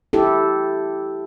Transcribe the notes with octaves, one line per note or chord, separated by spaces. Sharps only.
E4 G4 A4